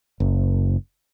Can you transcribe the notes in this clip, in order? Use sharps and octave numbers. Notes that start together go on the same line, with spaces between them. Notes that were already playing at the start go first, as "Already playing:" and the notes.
F#1